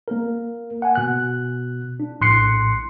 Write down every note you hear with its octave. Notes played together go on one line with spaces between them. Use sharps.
A#3 A#4
F#5 G#5
B2 F#6
D4
A#1 A2 C6 F#6 C7 C#7